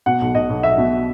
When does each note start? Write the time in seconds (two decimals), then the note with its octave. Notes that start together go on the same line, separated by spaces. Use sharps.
0.06 B2 F#5
0.21 B1
0.35 B1 D#5
0.50 B1
0.63 B1 E5
0.78 B2